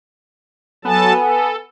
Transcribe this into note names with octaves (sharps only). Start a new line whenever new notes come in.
F#3 B3 A4 G#5 A5
A4